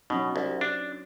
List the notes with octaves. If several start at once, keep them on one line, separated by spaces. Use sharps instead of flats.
B2 F#3 C#4 D#4
C2
D4